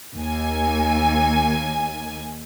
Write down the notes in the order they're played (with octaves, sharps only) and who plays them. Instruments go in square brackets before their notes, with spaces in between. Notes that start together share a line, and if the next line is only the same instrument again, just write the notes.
[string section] D#2 G#5